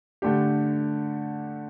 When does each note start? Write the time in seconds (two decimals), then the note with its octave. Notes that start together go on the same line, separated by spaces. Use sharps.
0.22 D3 A3 D4 G4